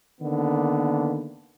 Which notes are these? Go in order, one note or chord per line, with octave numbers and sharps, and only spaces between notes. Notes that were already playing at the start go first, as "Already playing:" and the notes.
D3 D#3 A#3 B3